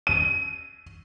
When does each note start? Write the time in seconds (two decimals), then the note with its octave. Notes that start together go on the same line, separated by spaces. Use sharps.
0.07 D#7